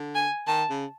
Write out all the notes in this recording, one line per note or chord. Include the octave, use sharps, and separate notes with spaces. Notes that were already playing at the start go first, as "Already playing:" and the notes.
Already playing: D3
G#5
D#3 A5
C#3